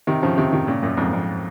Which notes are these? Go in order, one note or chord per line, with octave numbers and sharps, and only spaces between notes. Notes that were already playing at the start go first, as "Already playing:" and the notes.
C3 D#3
C#3 F3
C3 D#3
C3 D#3
A#2 C#3
F#2 A#2
F2 G#2
F2